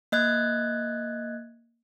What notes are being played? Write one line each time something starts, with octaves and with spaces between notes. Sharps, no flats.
A#3 D#5 F#6 G#6